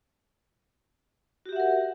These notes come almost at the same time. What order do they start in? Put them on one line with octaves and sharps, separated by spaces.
F#4 G4 E5 F#5 A#4